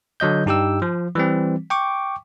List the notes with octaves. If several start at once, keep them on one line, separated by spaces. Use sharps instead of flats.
D3 F#3 D#5 G6
G2 D#4 G4 G5 E6
F3
E3 G3 C4
G5 C#6 D6